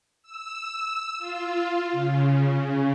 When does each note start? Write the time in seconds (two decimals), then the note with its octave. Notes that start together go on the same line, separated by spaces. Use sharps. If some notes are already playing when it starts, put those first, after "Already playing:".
0.23 E6
1.19 F4
1.92 C#3